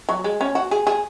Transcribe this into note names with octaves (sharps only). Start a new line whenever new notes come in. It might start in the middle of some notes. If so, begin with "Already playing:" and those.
F#3
G#3
C#4
F#4
G#4
G#4